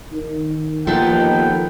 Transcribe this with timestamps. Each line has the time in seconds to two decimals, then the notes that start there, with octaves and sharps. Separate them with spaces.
0.12 D#3
0.87 D#2 F3 B3 D#4 A4 G5